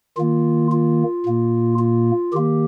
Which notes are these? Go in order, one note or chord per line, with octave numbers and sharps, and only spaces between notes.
D#3 A#3 F4
F4
A#2 A#3
F4
D#3 A#3 G4